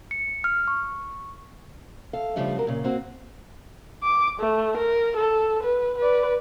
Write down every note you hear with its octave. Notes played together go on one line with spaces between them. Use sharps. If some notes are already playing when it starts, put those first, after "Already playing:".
C#7
F6
C#6
A4 F5
C#3 F3 G3 A3 D4
F#3 A#4
A#2 C#3
A#3 C4 F#4
D6
A3
A#4
A4
B4
B4 D5